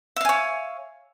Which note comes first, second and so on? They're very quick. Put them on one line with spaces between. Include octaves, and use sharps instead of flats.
E5 F5 G#5 C#5